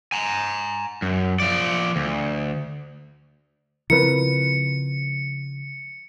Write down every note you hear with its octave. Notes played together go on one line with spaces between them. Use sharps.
G#5 A#5
F#2
F3 D5
D2
C#3 F3 C4 E4 A#4 B4 C#7